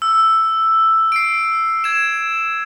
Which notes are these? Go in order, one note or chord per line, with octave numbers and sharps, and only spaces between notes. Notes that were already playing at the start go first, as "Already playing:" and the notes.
E6
C7 D7
G#6 E7